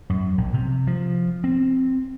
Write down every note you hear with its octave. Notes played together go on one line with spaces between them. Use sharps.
F#2
A#1
C3
F3
C4